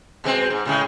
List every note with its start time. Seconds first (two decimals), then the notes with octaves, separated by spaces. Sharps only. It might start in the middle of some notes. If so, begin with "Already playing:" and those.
0.24 B2 G#3 C4
0.50 G#2
0.65 A2 C#3 G#3